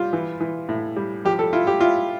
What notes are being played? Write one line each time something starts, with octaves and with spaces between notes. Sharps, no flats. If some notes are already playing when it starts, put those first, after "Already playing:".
Already playing: G3 F4
E3
E3
A2
G3
F3 G4
A4
E4 F4
G4
E4 F4